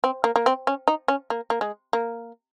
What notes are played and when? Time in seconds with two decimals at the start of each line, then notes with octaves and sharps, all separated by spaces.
0.04 C4
0.24 A#3
0.36 A#3
0.46 C4
0.67 C#4
0.88 D#4
1.08 C#4
1.30 A#3
1.50 A#3
1.61 G#3
1.93 A#3